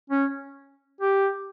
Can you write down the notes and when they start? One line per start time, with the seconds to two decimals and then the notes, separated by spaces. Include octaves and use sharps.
0.10 C#4
1.01 G4